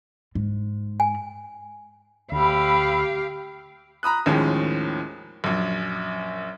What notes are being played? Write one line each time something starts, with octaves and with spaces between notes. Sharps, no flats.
G#2
G#5
D2 G4 F5 B5 E6
A#5 B5 D#6 F#6
D#2 A2 D#3 F3 G#3 C#4
A#1 F#2